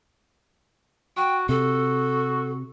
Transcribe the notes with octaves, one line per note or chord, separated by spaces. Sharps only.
F#4 G5
C3 F#4 A4